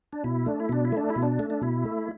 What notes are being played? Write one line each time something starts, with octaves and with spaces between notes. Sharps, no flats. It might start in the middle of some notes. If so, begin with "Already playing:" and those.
D4
B2 E4
A3 D4
E4
B2 D4
E4
A3 D4
E4
B2
D4
A3
D4
B2 E4
A3